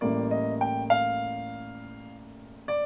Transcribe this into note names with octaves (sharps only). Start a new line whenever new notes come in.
A1 A2 G3 A#3 D5
D#5
G5
F5
D5